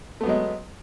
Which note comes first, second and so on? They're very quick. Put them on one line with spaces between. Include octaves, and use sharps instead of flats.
A3 B3 F#3 G#3